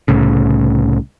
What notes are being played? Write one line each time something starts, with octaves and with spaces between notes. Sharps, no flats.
C2 A2 C#3